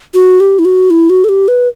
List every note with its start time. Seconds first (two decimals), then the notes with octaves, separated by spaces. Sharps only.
0.14 F#4
0.40 G4
0.59 E4
0.65 F#4
0.90 E4
1.10 F#4
1.24 A4
1.29 G4
1.48 B4